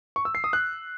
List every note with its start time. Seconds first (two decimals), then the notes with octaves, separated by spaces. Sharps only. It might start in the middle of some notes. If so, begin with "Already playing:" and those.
0.16 C#6
0.25 E6
0.35 C7
0.44 D#6
0.53 F#6